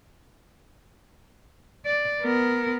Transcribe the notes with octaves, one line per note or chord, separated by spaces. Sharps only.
D5
B3 A#4